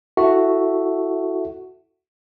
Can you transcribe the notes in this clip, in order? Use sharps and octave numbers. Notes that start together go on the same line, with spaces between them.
E4 F#4 A4 E5